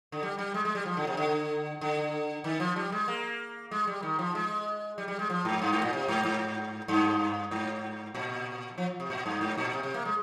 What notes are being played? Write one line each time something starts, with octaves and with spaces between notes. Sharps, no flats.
D3
G3
G3
G#3
G#3
G3
F3
D3
C3
D3
D3
D#3
F3
G3
G#3
A#3
G#3
G3
D#3
F3
G#3
G3
G3
G#3
F3
G#2
G2
G#2
A#2
C3
G#2
G#2
G2
G#2
A#2
F3
C3
A#2
G2
G#2
A#2
C3
C3
A#3
G#3